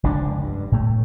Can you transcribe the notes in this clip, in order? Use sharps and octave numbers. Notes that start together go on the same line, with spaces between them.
F1 C#2 D3 D4
G2
A2 A3